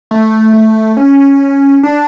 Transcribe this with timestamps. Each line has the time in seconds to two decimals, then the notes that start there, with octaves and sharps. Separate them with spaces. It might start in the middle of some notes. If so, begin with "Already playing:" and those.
0.11 A3
0.53 A3
0.97 C#4
1.83 D4